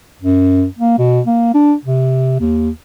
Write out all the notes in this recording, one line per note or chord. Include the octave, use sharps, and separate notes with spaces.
F#2
A#3
B2
A#3
D4
C3
D#2